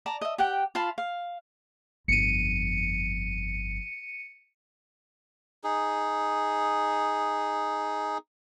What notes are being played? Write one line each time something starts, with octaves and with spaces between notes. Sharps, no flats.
D5 A5 A#5
D#5 E5
G4 F#5 G5
F4 F5 A5 B5
F5
G1 F2 C#7 D#7
D#4 G#4